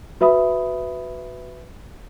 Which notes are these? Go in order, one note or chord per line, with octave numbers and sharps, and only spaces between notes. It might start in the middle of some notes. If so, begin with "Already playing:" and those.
F#4 B4 E5 B5 D#6